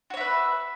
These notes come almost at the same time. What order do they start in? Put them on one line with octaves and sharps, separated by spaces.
F#4 C#5 E5 B4